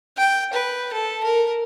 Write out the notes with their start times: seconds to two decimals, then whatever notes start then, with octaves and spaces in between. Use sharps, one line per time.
0.18 G5
0.53 B4
0.92 A4
1.23 A#4